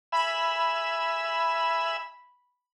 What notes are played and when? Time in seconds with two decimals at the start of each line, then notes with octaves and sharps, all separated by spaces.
0.12 E5 G#5 B5 E6